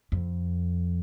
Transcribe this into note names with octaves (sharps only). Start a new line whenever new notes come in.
F2